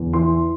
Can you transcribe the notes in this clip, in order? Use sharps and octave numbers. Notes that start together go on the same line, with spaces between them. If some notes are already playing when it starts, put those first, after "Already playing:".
Already playing: E2
E3 C6